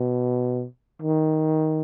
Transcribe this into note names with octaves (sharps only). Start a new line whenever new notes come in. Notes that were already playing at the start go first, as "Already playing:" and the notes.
Already playing: B2
D#3